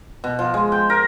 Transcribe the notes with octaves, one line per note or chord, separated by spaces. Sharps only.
B2
F3
G#3
G5
A#4